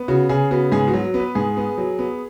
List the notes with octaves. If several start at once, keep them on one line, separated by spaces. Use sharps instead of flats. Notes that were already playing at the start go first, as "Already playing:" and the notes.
Already playing: B3
C#3 F#4
C#3 G#4
B3 F#4
G#2 G#4
F#4
F#3
B3
B4
G#2 G#4
B3
F#3
B3